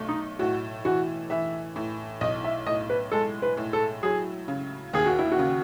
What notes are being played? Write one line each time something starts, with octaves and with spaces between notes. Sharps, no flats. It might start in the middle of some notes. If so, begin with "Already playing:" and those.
Already playing: B1 A3
D#4
A2 F#4
E3 F#4
E3 E5
A2
B1 D#5
E5
A2 D#5
B4
G#3 A4
B4
A2
A4
F#3 G#4
C#3
D#2 G#4
F#4
E4
F#4
C#3